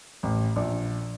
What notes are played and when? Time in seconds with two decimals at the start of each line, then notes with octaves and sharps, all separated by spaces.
0.23 A1
0.56 A#1